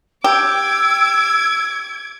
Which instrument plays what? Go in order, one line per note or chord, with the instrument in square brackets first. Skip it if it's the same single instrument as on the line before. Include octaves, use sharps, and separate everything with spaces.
[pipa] G4 [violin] D6 G#6 [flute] E6